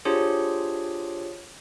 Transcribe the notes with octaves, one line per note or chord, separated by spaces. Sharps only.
D4 F4 G4 G#4 C5 C#5